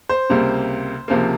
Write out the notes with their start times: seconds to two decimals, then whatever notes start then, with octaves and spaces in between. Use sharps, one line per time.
0.09 C5
0.30 C#2 C3 G3 A#3
1.08 C#2 C3 F3 A#3